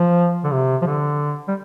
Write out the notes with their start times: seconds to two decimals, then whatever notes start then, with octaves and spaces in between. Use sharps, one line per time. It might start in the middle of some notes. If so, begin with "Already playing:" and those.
Already playing: F3
0.44 D3
0.52 C3
0.82 F3
0.86 D3
1.48 G3